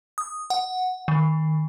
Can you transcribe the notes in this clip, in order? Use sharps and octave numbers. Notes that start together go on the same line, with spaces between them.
D#6
F#5
D#3